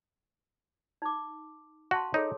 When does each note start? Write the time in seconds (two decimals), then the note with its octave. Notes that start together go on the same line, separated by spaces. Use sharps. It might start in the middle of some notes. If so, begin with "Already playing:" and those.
1.02 D#4 D6
1.91 F#4 F5 A5 C6
2.14 D#4 G#4 A4 C#5